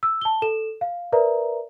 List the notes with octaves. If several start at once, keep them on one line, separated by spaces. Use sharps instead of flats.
E6
A5 G7
A4 E7
F5
A#4 B4 D5 E5 A#5